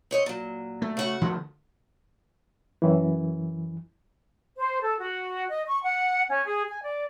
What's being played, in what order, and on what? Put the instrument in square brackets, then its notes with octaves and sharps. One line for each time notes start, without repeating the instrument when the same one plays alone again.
[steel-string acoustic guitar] C4 C#5 D#5
A#2 F#3
[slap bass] A3
[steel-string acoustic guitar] C#3 F#4 F#5
[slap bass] D3 F3 A3
[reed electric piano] F#2 E3
[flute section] C5
A4
F#4
D#5
C#6
F#5
C#4
G#4
G#5
D5